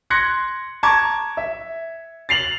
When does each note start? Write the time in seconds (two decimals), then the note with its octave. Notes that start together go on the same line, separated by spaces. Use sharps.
0.10 C6 F#6 G#6 A#6 C#7
0.83 A5 A#5 C#6 D6 G#6
1.37 E5
2.29 A6 C7 F7 F#7